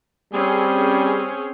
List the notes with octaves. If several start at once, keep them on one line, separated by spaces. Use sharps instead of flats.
G3 C4 C#4 G#4